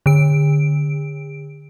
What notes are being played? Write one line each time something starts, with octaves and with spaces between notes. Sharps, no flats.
D3 D7